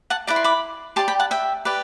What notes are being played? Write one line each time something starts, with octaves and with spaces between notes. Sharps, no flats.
F#5 A5
E4 B4 D5 D6
C6
B5 D6
G4 D5 A5 C6
G5 B5
F#5 A5
E5 G5
G4 B4 D5